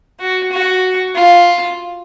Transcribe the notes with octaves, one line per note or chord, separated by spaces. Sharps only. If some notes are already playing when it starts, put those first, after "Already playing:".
F#4
F#4
F4